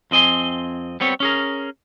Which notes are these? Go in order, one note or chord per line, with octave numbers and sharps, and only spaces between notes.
F2 C4 D#5 G#5 C6
G3 B3 C4 C#5
C#4 G#4 A#4